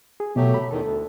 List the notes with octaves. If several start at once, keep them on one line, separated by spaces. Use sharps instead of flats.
G#4
B2 F#3 A3 G4
B5
E2 D#3 A4
D2